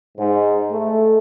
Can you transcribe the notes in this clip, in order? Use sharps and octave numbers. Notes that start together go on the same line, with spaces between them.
G#2
A3